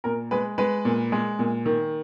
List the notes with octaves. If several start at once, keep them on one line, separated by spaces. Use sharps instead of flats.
A#2 A#4
G#3 B4
G#3 B4
A#2
G#3
A#2
D#3